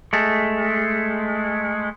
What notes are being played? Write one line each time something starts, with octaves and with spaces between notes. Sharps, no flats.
G#3 A3